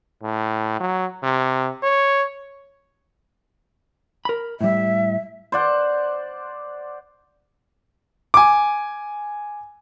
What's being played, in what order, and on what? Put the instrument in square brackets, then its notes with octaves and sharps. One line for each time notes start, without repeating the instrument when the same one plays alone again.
[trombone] A2
F#3
C3
C#5
[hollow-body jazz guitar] A#4 B5
[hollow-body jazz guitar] A2 G3 [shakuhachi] E5
[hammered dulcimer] C5 D5 F#5
[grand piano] G#5 D6